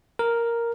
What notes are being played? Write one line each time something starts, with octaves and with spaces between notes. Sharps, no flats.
A#4